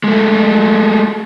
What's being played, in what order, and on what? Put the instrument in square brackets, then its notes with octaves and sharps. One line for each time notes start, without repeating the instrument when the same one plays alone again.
[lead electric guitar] G#3 A3